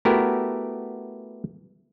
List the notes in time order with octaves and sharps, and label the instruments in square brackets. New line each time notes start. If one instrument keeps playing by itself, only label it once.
[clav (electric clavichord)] A3 B3 E4 F#4 G4 A#4